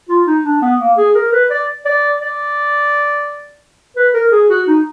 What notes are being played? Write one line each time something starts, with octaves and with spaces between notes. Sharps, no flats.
F4
D#4
D4
B3
A#3
G#4
A#4
B4
D5
D5
D5
B4
A#4
G#4
F#4
D#4